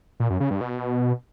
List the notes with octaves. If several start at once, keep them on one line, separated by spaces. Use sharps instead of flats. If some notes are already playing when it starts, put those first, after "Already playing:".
A#2
F#2
C#3
G2
B2